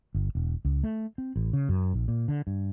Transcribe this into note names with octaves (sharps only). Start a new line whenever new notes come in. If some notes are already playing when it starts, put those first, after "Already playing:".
G1
E1
C#2
A3
C4
A1
C#3
F#2
A#1
A#2
D3
G2